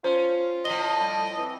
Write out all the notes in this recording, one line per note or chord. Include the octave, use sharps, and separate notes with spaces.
C#4 F4 C5
A2 F3 D#5 G7
D3 G3
E3 C4